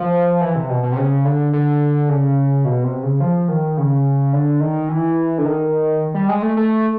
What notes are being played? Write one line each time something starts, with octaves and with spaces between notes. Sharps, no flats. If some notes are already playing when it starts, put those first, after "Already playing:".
Already playing: F3
E3
C3
B2
B2
C3
C#3
D3
D3
C#3
B2
C3
C#3
F3
D#3
C#3
D3
D#3
E3
D3
D#3
G3
G#3
A3
A3